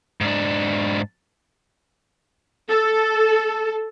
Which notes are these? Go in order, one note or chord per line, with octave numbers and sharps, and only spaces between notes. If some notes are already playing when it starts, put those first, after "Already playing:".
G#2 D4
A4